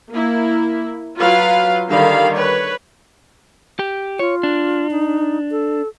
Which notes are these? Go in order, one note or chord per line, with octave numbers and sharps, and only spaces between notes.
A#3 E4
F#3 F4 B4 F5
D3 D#3 G3 F5 B5
B4 C#5
G4
F4 C#5
D4
D#4
A4